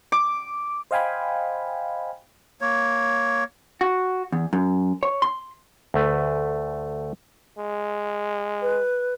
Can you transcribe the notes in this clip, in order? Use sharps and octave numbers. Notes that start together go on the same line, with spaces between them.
D6
C5 D#5 F5 G5 G#5 B5
A#3 C#5
F#4
E2
F#2
C#5
C6
D2 A3 B4
G#3
B4